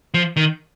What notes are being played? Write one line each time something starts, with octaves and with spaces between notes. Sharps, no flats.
F3
D#3